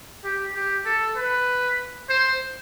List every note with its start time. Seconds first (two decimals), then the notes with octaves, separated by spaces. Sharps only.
0.24 G4
0.55 G4
0.85 A4
1.17 B4
2.09 C5